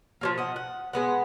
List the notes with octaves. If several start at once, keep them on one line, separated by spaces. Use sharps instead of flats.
F3 F#3 A#3
D#5 F#5
F#5
G#3 B3 F#5